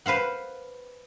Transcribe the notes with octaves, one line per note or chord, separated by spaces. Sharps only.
B4 C5 F5 F#5